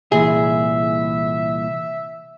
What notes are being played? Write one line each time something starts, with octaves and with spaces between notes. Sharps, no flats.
C2 A#2 E3 G#4 E5